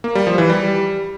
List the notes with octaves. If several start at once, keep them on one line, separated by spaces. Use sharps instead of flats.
A#3
G3
F3
E3
G3